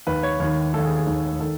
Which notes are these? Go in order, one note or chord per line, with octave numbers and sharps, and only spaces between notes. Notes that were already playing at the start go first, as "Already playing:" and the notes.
D#2 D#3 B4
C#5
D#2 D#3 C#5
D#2 D#3 A4
G#4
G#4
D#2 D#3
D#3 A4